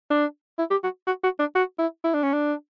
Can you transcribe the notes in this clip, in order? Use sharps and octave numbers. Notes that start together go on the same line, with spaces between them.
D4
E4
G4
F#4
F#4
F#4
D4
F#4
E4
E4
D4
C#4
D4